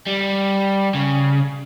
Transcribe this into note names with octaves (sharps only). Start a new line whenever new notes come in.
G3
C#3